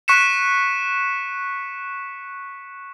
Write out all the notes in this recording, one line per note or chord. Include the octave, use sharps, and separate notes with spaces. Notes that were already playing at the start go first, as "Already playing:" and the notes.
C#6 F#6 B6 C#7 E7